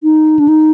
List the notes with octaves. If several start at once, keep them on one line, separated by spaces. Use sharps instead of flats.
D#4
D4
D#4